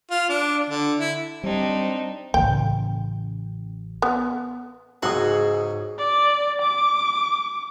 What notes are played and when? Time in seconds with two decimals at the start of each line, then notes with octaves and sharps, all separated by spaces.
0.11 F4
0.29 D4
0.70 D3
1.00 E4
1.44 G3 C4 D4 D#4
2.34 A1 C#3 G5
4.02 B3
5.03 C#2 G#2 F#4 G#4 C6 D#6 E6
5.99 D5
6.62 D6